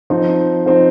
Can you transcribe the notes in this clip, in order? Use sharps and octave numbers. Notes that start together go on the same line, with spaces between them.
F3 C4 D#4
F3 C4 D#4